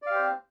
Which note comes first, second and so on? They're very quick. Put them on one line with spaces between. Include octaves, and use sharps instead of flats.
D5 F5 G4 C5 C4